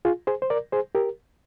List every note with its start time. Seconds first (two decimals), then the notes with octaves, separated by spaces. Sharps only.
0.05 F4 G#4
0.27 G#4 C5
0.42 C5
0.50 A#4 D5
0.72 G#4 C5
0.95 G4 A#4